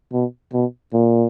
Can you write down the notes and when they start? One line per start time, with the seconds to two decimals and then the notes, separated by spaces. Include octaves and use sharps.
0.13 B2
0.53 B2
0.93 A#2